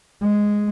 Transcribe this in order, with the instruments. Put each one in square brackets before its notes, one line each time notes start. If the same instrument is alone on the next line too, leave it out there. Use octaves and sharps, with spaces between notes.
[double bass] G#3